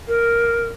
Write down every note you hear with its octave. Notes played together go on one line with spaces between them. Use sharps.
A#4